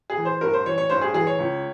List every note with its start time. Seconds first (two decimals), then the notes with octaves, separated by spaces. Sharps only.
0.10 G#4
0.17 E3
0.25 C5
0.41 G2 A#4
0.53 C5
0.66 E3 C#5
0.78 C#5
0.90 G2 C5
1.01 G#4
1.14 E3 G#4
1.27 C#5
1.39 C#2